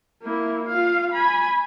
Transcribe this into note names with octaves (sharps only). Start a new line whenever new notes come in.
A#3 E4
F4 F5
G#5 B5